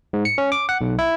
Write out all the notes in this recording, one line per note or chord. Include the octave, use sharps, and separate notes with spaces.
G#2
C#7
C#4
D6
F#5
B1
E4